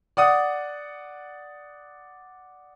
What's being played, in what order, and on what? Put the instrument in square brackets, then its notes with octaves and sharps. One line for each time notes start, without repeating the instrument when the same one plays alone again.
[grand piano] D5 F#5 D#6